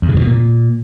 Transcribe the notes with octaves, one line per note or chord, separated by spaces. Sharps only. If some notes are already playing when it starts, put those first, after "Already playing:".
E2
C#3
G2
B2
A#2